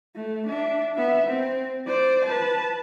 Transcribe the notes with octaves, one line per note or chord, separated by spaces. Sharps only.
A3
D4 E5
B3 E5
C4
C5 D5
B4 A5